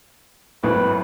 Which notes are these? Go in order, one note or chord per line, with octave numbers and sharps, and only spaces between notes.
G#1 F#2 A2 B4